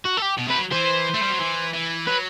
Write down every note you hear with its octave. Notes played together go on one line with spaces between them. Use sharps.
F#4
A4
G4
B2
C3 B4
F#3
E3 C5
A3
G3
F#3
E3
E3
F#3 B4